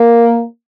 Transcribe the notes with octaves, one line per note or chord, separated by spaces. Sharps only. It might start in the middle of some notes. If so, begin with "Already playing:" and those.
Already playing: A#3